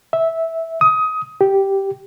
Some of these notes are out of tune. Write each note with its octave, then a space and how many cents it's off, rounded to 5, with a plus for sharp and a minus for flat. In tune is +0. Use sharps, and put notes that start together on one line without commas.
E5 -10
D#6 +20
G4 -5